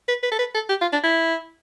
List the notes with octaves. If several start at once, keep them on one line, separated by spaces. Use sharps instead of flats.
B4
B4
A4
B4
A4
G4
F4
D4
E4